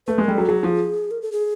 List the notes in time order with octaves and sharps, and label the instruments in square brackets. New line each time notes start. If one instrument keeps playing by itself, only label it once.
[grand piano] A3 [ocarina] B4
[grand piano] G#3
[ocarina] A#4
[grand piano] G3 [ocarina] A4
[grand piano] F#3
[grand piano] F#3 [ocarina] G#4
[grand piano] F3
[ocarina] A#4
A4
G#4